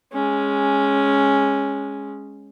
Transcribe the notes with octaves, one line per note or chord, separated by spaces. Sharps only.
G#3 C#4